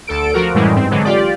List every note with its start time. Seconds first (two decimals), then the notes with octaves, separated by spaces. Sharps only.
0.07 D2 A4 D7
0.33 F3 F#4 A#4
0.54 F#2 A2 E3 G3 G#3
0.75 G#2 C4
0.91 D3 E3 F#3 G#3
1.04 F4 G4 D5